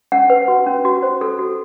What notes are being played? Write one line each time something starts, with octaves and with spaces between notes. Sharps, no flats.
C#4 F#5
B4
F#4
C#4
F#4
C5
A4
F#4